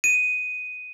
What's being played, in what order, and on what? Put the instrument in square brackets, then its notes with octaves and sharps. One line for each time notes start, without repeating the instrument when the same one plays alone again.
[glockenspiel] D#7